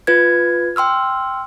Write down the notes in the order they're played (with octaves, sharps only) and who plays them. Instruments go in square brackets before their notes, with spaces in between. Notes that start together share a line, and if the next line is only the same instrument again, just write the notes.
[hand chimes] F4 B4 G#6
G5 C6 E6 F6